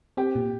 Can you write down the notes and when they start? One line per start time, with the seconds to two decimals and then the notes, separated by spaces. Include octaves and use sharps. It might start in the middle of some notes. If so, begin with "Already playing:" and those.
0.17 C4 G4
0.35 A#2